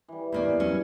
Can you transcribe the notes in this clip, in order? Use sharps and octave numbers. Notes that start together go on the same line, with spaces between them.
E3 G3
E2 A#3 D5
F#3 C#4